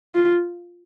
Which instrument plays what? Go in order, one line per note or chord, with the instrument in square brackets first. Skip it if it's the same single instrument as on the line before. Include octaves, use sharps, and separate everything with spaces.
[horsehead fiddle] F4